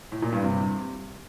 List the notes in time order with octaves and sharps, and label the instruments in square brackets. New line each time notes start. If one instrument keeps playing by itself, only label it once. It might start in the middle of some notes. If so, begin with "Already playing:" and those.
[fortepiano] A2
A#2
G2
C3